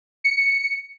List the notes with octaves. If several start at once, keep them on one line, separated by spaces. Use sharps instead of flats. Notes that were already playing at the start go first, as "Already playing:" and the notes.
C#7